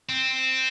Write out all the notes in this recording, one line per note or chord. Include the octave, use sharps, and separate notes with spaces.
C4